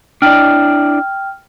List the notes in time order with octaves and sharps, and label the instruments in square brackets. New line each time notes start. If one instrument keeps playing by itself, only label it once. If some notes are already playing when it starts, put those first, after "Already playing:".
[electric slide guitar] D4 E4 D5 [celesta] G5 F6